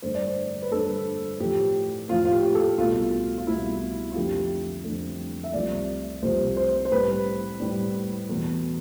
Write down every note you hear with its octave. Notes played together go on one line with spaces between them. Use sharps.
G2 D3 A3 C5
D5
C5
B4
G2 D3 A3 A4
A2 F3 A3 G4
A2 F3 A3 F4
F4
G4
A4
C2 B2 A3 F4
F4
C2 B2 A3 E4
F4
F2 D3 A3 G4
F2 D3 A3
E5
C2 C3 F3 A3 D5
C2 C3 F3 A3 C5
C5
C5
A2 G3 B4
A2 G3
E2 B2 A3